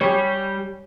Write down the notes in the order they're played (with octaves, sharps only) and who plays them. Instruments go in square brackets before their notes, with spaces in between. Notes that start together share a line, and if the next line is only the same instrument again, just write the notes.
[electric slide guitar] G3 G4 [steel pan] C#5